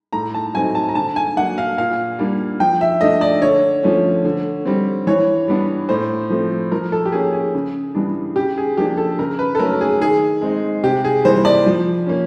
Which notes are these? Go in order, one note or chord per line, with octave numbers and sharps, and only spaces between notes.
A2 A#5
A5
F#3 A3 C4 D#4 G#5
A5
A#5
D3 A5
G#5
F#3 A#3 D4 F#5
F5
A#2 F5
G3 A#3 D4
F3 G5
E5
A3 D4 D#5
D5
D3 C#5
F3 A3 C#4
D3
G3 C4
E3 C#5
G3 B3 D4
A2 C5
F3 A3 C4
F3 A#4
A4
G4
A#3 C#4 G#4
G#4
C#3
E3 G3 B3 D4
C#3 G4
G#4
F3 A#3 D4 G4
A4
C#3 A#4
B4
A4
F#3 A3 C#4 A#4
G#4
D#3 G#4
G#3 C4 D#4
C3 G4
G#4
E3 G3 A#3 C5
D5
F3
A#3 C#4